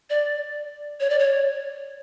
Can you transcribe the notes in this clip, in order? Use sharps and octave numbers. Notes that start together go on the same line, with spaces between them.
D5
C#5
D5
C#5